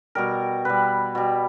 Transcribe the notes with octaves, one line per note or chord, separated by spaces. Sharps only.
B2 G3 A#4
B2 G3 B4
B2 G3